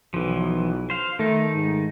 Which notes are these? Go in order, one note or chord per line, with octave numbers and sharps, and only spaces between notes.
B1 E3 F3
C5 F5
D#3 A3 D#4
G#2